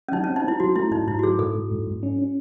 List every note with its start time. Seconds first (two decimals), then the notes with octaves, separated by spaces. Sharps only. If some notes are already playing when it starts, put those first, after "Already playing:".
0.08 C#4
0.12 F#3 D#4
0.24 C#4
0.28 C4
0.36 D#4
0.44 C4 E4
0.60 F#3 F#4
0.76 A3 E4
0.91 G#2 D#4
1.07 G#2 E4
1.19 F#4
1.23 F#3 G#4
1.39 G#2 A4
1.55 G#2
1.71 G#2
1.87 G#2
2.03 C#4
2.19 C#4